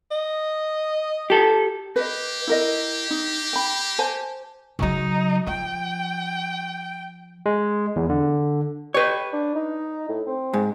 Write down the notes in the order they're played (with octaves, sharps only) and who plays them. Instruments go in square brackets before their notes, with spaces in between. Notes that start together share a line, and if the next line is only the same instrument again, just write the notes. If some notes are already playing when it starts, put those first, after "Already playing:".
[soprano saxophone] D#5
[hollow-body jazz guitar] G4 A4
[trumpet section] A#3 G4 [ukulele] B4 D#5
[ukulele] E4 A#4 D#5
D#4
G5 B5
C5 G#5 A5
[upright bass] C#3 F#3 [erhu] D#4
[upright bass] F3 [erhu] G5
[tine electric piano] G#3
E2
D3
[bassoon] G4 [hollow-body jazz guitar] B4 C#5
[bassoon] D4
D#4
A2
C4
[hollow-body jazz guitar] G#2